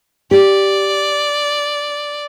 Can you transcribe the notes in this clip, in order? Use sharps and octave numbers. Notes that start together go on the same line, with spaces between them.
G4 D5